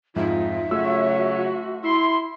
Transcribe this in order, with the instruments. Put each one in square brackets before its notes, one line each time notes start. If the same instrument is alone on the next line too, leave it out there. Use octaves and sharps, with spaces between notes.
[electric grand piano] F2 G#2 [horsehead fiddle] D#4 F4 [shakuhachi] E5
[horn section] C#3 F#3 C#5 [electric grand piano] A3 F4 E6 [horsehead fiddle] F#4
[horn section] E4 C6